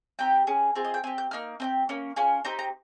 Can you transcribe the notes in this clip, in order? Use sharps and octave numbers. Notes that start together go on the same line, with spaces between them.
C4 D#4 G4 G5
C#4 G#4
C4 F4 G#4
D#5
G5
C4 G4 G#5
G6
A#3 D#4 F6
C4 D#4 G4
A#3 C#4
C#4 F4 G#4
C4 D#4 G4 A#5
A#5